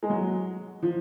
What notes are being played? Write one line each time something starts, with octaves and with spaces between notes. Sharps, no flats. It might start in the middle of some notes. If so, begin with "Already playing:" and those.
G#3
F#3
F3